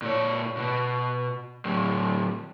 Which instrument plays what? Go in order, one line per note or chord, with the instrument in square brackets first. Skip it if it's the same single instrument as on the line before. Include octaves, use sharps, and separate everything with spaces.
[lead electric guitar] A#2 C#5
B2 B3
A2 F#3